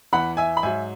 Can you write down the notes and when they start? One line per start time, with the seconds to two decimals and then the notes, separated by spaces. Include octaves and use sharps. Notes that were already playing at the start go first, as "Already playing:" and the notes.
0.12 E2 E3 F#5 B5
0.37 E5 G#5
0.57 B5
0.63 G#2 F#3 E5 G#5